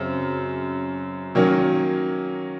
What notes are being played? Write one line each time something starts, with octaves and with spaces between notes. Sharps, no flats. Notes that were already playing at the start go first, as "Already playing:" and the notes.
Already playing: F#2 C#3 C4
D#3 F#3 A#3 C#4